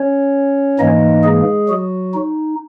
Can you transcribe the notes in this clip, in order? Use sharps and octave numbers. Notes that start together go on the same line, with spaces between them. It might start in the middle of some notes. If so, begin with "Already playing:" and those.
Already playing: C#4 C#5
G#2 E3 A#3 D#4 D#5
G#3 G#4
F#3 F#4
D#4